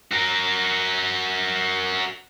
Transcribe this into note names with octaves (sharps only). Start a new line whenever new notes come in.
F#4 A#4